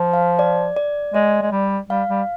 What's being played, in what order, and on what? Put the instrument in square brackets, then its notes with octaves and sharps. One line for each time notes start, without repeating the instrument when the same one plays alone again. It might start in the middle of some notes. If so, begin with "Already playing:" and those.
Already playing: [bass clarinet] F3
[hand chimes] F5
D5
D5
[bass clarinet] G#3 [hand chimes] D5
[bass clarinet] G#3
G3
[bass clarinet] G3 [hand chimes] F5
[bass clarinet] G3